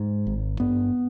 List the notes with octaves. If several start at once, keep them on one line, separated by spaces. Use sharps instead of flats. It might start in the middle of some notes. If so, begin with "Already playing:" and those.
Already playing: G#2
G#1
G2 B3